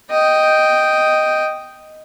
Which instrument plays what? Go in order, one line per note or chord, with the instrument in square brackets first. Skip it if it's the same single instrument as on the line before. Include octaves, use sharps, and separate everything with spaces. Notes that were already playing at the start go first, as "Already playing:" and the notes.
[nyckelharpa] D#5 G5